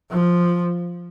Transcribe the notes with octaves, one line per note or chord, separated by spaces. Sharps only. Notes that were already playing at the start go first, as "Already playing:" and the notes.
F3